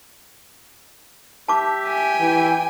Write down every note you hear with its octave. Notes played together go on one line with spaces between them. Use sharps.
G4 E5 A5 D6
G5 G#5
E3